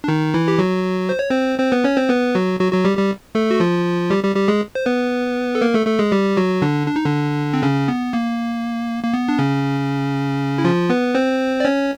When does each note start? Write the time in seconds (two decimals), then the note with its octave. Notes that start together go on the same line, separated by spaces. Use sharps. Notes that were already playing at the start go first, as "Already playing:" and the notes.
0.04 D4
0.08 D#3 D#4
0.34 E3 E4
0.48 G4
0.59 F#3 F#4
1.09 C5
1.19 C#5
1.30 C4 C5
1.59 C4 C5
1.72 B3 B4
1.84 C#4 C#5
1.97 C4 C5
2.09 B3 B4
2.35 F#3 F#4
2.60 F#3 F#4
2.72 F#3 F#4
2.85 G3 G4
2.97 G3 G4
3.35 A3 A4
3.51 F#4
3.60 F3 F4
4.10 G3 G4
4.24 G3 G4
4.36 G3 G4
4.48 G#3 G#4
4.75 C5
4.86 B3 B4
5.55 A4
5.61 A#3 A#4
5.74 A3 A4
5.86 A3 A4
5.99 G#3 G#4
6.12 G3 G4
6.37 F#3 F#4
6.62 D3 D4
6.87 D4
6.96 D#4
7.05 D3 D4
7.54 C4
7.63 C#3 C#4
7.88 B3
8.13 A#3
9.04 A#3
9.14 B3
9.29 D4
9.39 C#3 C#4
10.58 E4
10.64 F3 F4
10.90 B3 B4
11.15 C4 C5
11.60 D5
11.65 C#4 C#5